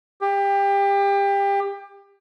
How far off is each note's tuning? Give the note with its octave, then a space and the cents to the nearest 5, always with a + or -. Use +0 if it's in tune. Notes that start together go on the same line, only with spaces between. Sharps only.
G4 +25